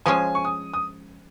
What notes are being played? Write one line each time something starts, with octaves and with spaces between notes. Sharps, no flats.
F3 G#3 C#4 G#4 G#5
C#6
D#6
D#6